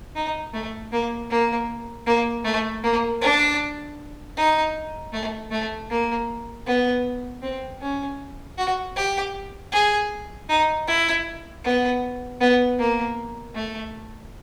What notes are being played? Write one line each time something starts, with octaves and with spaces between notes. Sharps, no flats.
D#4
A3
A#3
A#3
A#3
A3
A#3
D4
D#4
A3
A3
A#3
B3
C4
C#4
F#4
G4
G#4
D#4
E4
B3
B3
A#3
A3